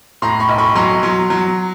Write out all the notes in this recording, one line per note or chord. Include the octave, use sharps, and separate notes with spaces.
A2 A#5 C6
B5 C#6
B1
B5 C#6
F#3 A#5 C6
F#3
F#3